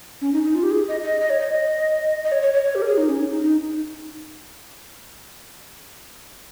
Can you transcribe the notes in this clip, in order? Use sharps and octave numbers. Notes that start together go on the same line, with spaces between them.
C#4
D#4
D#4
F4
G4
G#4
D#5
D#5
D#5
C#5
D#5
D#5
C#5
C#5
C#5
C#5
G4
A#4
G#4
D#4
C#4
D#4
D#4
D#4